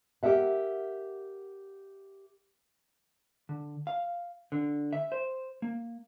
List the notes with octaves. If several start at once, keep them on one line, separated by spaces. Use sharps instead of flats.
G4 A4 A#4 E5 F#5
D3
F5
D3
E5
C5
A#3